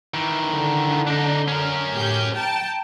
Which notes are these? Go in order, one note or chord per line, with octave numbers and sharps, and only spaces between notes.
D#3 E3
D3
D4 D#4
C#4 A#4
A2 G4 G6
G5 A5 A#5